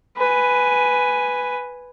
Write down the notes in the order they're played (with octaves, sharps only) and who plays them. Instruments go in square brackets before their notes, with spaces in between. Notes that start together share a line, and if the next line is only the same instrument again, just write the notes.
[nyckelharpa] B4 G#5